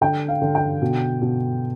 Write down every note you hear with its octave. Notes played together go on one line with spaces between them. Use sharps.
D3 G5
F5
D3
G5
B2
B2